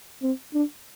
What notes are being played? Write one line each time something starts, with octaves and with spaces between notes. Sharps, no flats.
C4
D4